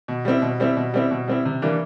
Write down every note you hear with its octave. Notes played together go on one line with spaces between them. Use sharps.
B2
G3 C4 E4
B2
G3 C4 E4
B2
G3 C4 E4
B2
G3 C4 E4
C3
E3 G3 A#3 D4